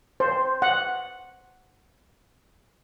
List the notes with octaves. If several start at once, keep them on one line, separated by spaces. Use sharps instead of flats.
C5
F#5